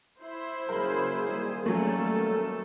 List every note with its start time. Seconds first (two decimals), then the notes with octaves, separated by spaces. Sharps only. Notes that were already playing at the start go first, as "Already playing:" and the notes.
0.21 E4 C5 E5
0.69 C#3 F#3 A#3 G#4 A#4 B5
1.29 D#3 G3 A#3
1.66 F#3 A3 C#4 A4